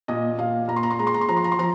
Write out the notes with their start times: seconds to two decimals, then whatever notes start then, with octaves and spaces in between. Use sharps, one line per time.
0.08 A#2 D#5
0.39 A#2 F5
0.68 A#2 A#5
0.76 C6
0.83 A#5
0.91 C6
0.99 G#3 A#5
1.07 C6
1.14 A#5
1.21 C6
1.28 F3 A#5
1.37 C6
1.44 A#5
1.52 C6
1.59 F3 A#5